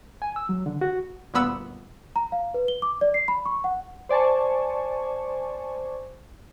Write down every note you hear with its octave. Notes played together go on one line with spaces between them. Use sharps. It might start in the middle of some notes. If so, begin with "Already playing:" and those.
G#5
E6
F#3
D3
F#4
G1 D2 A#2 B3 B5 E6
A#5
F5
B4
G7
D6
D5
C7
B5
C#6
F#5
C5 D5 G#5 A5 C#6